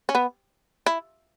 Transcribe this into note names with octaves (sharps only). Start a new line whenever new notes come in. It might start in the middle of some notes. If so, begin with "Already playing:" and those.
C#4
B3
E4